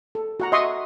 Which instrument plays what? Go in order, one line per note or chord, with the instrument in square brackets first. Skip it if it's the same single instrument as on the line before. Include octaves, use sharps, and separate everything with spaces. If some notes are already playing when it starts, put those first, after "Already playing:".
[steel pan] A4
F#4 F#5 A#5
D#5 E5 F#5 C6 C#6 D#6